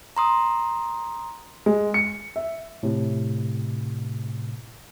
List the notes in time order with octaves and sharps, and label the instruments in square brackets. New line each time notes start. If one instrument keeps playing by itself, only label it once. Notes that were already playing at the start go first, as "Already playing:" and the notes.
[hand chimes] A#5 C6 D#6
[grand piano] G#3
C#7
E5
[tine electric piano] A2 C3